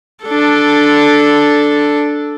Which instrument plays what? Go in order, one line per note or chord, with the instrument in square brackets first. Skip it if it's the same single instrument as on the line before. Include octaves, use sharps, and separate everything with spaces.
[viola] D4 A4